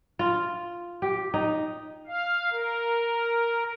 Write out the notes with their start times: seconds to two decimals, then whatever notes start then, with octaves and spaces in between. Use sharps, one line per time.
0.19 F4
1.02 G4
1.34 D#4
2.07 F5
2.52 A#4